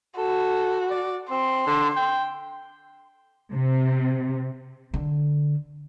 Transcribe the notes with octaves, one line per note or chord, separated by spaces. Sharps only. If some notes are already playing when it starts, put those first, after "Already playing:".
F#4 A4
D5
C4 C6
D3
G5
C3
D3